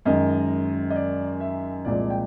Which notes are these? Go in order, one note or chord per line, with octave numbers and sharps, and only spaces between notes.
F#2 D#3 G#3 D#5
D#5
D5
E5
C2 A#2 F3 G#3 D5
G5